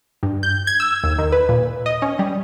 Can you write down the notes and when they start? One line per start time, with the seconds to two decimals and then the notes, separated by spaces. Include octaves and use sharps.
0.23 G2
0.43 G6
0.67 G#6
0.80 E6
1.04 D#2
1.19 D#3
1.32 B4
1.49 A#2
1.86 D#5
2.02 C#4
2.19 G3